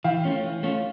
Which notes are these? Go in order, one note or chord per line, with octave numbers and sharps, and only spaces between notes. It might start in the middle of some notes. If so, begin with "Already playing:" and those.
E3 F5 G5
A3 C#4 F4
E3
A3 C#4 F4